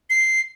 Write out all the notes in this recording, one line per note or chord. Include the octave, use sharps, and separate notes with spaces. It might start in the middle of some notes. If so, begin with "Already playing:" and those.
C7